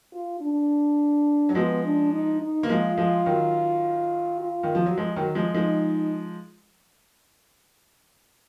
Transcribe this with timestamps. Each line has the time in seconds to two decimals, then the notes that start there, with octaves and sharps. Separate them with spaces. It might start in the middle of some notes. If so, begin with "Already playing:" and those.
0.12 F4
0.41 D4
1.49 F#3
1.55 F3 G#3 B3
1.84 D4
2.12 D#4
2.41 D#4
2.63 A#3
2.68 F3 G#3 F4
2.97 F3 G#3
3.26 D#3 F#3
4.40 F4
4.63 D#3
4.75 F3
4.86 F#3
4.97 F3 G#3
5.16 D#3 F#3
5.35 F3 G#3
5.54 F3 G#3 D#4